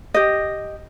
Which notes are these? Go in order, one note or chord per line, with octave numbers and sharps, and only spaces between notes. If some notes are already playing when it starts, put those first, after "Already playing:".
G4 D#5